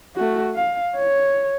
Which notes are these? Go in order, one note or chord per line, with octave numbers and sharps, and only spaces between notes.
A3 F#4
F5
C#5